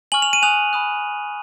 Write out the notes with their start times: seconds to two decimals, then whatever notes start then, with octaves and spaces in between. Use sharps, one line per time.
0.12 G#5 C#6 F6 F#7
0.22 F7
0.33 D#7
0.42 G#5 D#6 F#6 F7
0.73 B5 D#6 F#6